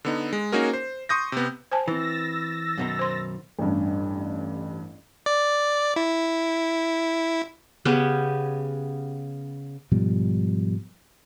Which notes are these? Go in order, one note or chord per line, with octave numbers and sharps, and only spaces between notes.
D3 B3 D#4
G#3
A#3 C#4 D#4 F#4 G#4 A#4
C5
C6 C#6 D#6 G6 A#6
C3 B3
C5 G#5 A5
E3 C4 E6 A6 A#6
F#2 B2 D#3
C5 C6
A1 G2
D5
E4
C#3 B3 C#4 G4
G#2 B2 F3 G3